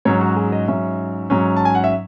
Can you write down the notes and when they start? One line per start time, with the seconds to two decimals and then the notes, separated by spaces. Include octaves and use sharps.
0.05 G#2 F#3 C#4 C#5
0.21 F#4
0.36 G#4
0.52 D#5
0.68 G#2 F#3 C#4 E5
1.30 G#2 F#3 C#4
1.57 A5
1.65 G#5
1.75 F#5
1.84 E5